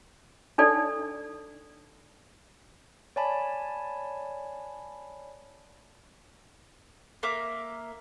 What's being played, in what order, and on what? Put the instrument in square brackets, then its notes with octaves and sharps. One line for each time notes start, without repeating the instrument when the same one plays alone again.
[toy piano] D4 D#4 A4 D5
[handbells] C#5 D5 G#5 A5 B5
[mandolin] A#3 E5 D6 F6